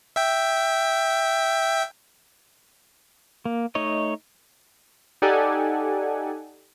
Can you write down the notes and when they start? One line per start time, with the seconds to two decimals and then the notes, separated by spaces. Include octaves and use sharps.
0.16 E5 G5
3.45 A#3
3.75 A3 D#4 C#5 D#5
5.22 D#4 G4 A4 D5 F#5 G#5